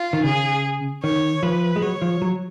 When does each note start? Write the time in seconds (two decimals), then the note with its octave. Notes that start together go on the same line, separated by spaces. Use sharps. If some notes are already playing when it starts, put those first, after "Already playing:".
Already playing: F4
0.13 D#3
0.24 C#3 G#4
1.03 D#3 C#5
1.43 F3 B4
1.76 G#3
1.82 F#3 C#5
2.02 F3
2.22 F#3